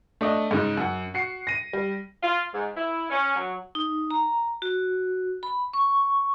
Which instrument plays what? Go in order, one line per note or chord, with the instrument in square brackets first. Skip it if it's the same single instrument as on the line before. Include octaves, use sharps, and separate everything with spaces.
[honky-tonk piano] A3 D4 D#5
G#2 C#3 D#4
F#2 F#5
F#4 C7 C#7
A#6 D#7
G3
[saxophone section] F4
G#2
E4
C#4
F#3
[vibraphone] D#4
A#5
F#4
B5
C#6